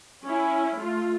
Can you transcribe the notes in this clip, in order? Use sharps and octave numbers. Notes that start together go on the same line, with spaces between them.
C#4 E4
A3 F4